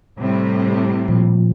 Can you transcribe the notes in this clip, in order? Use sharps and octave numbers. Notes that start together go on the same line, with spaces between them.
A2 C3 G3
A#2 F3